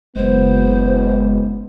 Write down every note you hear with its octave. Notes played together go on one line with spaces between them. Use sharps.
F#1 G#3 B3 C5